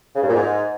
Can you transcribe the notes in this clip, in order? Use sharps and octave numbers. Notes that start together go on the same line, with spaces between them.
C#3
G2
A#2
G#2